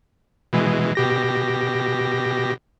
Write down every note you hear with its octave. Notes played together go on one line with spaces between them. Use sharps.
B2 E3 G#3
B2 G4 A#6